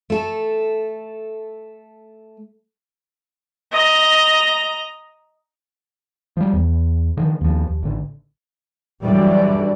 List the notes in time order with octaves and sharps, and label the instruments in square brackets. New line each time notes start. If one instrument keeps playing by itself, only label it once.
[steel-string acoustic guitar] A3 A4
[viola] D#5 A#5
[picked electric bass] F3 G3
E2
D3 D#3 F3
D#2 F3
D#2
A1 D3
[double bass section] G2 F#3 G3 [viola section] D3 E3 D5